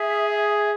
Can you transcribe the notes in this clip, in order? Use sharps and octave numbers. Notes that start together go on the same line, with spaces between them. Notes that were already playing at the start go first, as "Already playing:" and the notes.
Already playing: G#4 E5